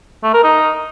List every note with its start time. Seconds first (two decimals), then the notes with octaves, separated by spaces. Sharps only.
0.24 A3
0.34 A#4
0.44 D#4